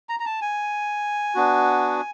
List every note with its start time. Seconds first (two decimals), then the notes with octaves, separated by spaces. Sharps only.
0.09 A#5
0.20 A#5
0.26 A5
0.42 G#5
1.35 B3 D4 F#4